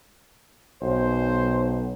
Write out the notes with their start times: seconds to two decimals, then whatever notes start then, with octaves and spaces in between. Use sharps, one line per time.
0.82 B1 C5